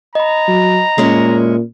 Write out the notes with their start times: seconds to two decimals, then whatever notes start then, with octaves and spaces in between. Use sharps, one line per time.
0.15 D#5 A#5 B5
0.48 F#3
0.98 A#2 G#3 C#4 E4